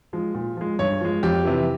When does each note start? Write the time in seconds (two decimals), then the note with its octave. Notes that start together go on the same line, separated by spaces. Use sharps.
0.13 F3 G#3
0.35 A#2
0.57 F3 G#3
0.79 G2 C#5
1.01 F3 G#3
1.23 F2 G4
1.45 C3 E3